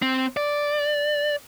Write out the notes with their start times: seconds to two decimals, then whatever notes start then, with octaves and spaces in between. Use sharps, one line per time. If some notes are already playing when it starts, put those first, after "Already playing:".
0.02 C4
0.37 D5